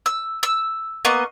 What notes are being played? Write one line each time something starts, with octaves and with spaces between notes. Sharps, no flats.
E6
E6
A#3 B3 D#5 C#6